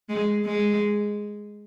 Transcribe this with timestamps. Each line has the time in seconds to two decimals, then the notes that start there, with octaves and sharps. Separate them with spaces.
0.09 G#3
0.45 G#3